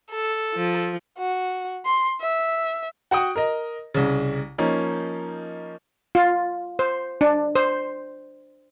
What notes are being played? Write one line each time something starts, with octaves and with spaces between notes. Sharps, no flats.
A4
F3
F#4
C6
E5
F#4 F#5 G5 D#6
A#4 D#5
C2 C#3
F3 A#3 C#4 D#4
F4
C5
D4
C5